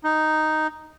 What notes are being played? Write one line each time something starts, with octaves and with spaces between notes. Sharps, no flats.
D#4